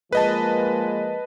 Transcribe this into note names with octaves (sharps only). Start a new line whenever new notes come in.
F3 G#3 A#3 B4 D#5 A5